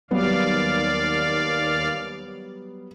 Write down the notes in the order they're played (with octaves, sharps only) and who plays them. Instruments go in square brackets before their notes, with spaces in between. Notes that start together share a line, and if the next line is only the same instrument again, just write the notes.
[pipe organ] D#2 D5 F5 [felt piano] F#3 G3 B3